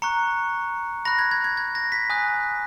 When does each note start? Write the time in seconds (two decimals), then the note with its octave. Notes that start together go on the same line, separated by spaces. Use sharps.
0.02 A#5 C#6 F#6 C#7
1.05 B5 F#6 A#6
1.19 G#6
1.31 G#6
1.44 G#6
1.57 G#6
1.75 A#6
1.92 B6
2.10 G#5 D#6 F#6